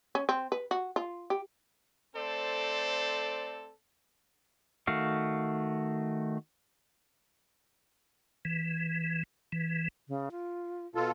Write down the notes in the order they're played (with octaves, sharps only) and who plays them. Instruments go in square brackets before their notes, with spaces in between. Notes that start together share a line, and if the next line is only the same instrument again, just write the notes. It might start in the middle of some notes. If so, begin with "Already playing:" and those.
[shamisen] C#4
C4
B4
F#4
F4
G4
[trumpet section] A3 C4 A4 C5 D5
[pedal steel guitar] D#3 A3 F#4 F5
[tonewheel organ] E3
E3
[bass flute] C#3
F4
[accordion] B2 F4 A4